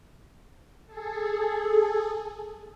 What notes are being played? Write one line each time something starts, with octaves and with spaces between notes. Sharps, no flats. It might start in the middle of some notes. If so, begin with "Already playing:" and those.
G#4 A4